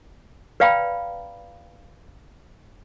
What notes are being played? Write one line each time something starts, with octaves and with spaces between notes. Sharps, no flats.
B4 D5 F5 G5 A#5 B5